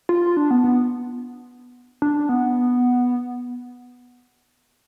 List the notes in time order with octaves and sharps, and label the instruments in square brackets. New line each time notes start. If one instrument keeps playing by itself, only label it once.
[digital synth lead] F4
D4
B3
B3
D4
B3